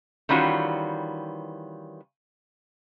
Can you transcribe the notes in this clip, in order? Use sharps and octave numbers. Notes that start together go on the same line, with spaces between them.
D#3 E3 G3 C#4 F4 F#4